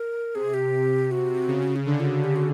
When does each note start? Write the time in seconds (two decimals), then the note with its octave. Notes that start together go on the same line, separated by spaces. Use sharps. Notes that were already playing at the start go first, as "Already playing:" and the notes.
Already playing: A#4
0.35 C3 G#4
0.54 G4
1.11 F#4
1.48 C#3
1.76 C#4
1.86 D3 D4
2.00 F4
2.05 F#4
2.24 G4
2.36 F#4